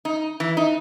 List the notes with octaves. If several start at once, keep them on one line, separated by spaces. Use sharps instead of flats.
D#4
E3
D#4